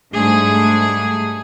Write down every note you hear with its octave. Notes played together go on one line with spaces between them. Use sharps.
G#2 G3 A3 D4 G#4